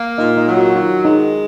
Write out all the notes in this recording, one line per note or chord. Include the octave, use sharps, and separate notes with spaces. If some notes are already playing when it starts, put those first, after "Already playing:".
Already playing: A#3
A#2 D#4 D#5
D#4 D#5
F#3
F#4
F#4
D#3 F4
G#3 D#4